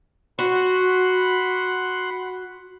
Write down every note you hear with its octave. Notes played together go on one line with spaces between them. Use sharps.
F#4 F#5 B5 C6